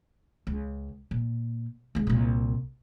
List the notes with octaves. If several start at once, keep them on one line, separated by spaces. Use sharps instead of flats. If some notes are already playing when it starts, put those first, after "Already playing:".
C#2
A#2
C2 G#3
C2 A#2